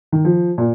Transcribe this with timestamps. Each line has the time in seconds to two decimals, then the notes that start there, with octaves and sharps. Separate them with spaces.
0.12 D#3
0.25 F3
0.58 A#2